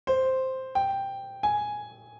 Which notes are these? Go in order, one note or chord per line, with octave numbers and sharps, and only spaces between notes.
C5
G5
G#5